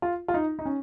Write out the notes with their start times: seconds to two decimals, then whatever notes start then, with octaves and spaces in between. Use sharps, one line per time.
0.02 F4
0.28 F4
0.34 D#4
0.59 D#4
0.65 C#4